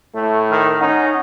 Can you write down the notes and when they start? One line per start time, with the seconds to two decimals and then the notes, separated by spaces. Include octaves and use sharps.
0.15 A2 A3
0.51 D#3 F6
0.81 C#4 D#4 F#5